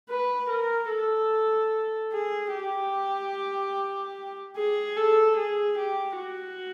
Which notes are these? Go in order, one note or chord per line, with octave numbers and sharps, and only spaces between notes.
B4
A#4
A4
G#4
G4
G#4
A4
G#4
G4
F#4